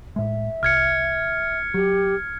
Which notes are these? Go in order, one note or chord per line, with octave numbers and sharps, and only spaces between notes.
A2 G#3 E5
C2 F6 G#6 C#7
F#3 G4